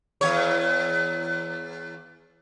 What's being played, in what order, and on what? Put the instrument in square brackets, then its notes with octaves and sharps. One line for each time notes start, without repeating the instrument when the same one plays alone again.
[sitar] E2 C#5